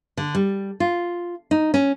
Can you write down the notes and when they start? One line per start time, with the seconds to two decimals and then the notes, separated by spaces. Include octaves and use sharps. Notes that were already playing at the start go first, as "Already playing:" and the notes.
0.17 D3
0.35 G3
0.80 F4
1.51 D#4
1.74 C#4